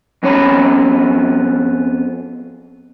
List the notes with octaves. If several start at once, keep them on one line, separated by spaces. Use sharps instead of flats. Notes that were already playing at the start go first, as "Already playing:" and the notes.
F2 B3 C#4 C#5 A#5 B5